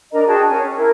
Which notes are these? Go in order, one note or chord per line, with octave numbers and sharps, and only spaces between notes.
D4 A#4 D#5 A#5
F#4 G#4 G5 A5
C#4 G#5
C#4
E4 A#4